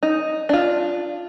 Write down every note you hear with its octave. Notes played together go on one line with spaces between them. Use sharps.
D#4
D4 F4